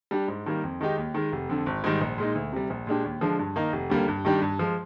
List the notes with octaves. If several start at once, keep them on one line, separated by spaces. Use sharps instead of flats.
G3 D4 G4
G#2
D#3 G3 A#3
F2
D#3 G#3 D#4 G4
D#2
D#3 G#3
F1
F2 D3
G#1
G#2 D#3 G3
A#1
A#2 G#3 D#4
D2
C3 G3
A#1
A#2 G#3 D4 G4
D#2
D3 F3 G#3 D4
G2
D#3 A#3 D#4
F1
D#2 D3 G3 A#3
G2
D#3 G3 D4 G4
G2
F3 G#3